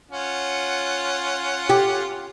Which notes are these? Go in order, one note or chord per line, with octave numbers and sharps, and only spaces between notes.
C#4 F4 F#5
G4